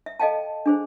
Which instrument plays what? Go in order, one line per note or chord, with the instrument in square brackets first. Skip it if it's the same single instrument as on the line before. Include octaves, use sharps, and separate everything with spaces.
[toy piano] E5
A4 D#5 F5 G5 A5
D4 G#4 C5